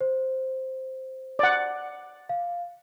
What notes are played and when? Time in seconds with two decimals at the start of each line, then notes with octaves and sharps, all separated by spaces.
0.01 C5
1.39 D5 F#5
2.29 F5